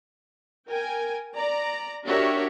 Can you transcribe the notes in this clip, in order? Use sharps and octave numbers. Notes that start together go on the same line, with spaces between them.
A#4 G5 G#5
D5 A#5
D4 F#4 G4 A#4 C#5 E5